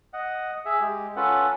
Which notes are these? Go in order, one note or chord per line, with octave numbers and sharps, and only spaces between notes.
D#5 F#5
G#4 E5
G#3 G4
C#4 F4 A4 B4 F#5